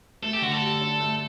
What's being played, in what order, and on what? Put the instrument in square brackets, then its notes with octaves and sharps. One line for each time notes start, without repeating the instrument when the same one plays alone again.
[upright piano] A3 [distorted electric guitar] A4
[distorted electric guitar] G4
[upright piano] D3 [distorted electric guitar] F#4
[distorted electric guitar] A4
[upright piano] G4
D4
A3